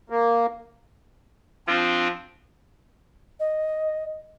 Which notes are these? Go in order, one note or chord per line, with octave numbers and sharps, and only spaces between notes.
A#3
F3 C4 D4 F4
D#5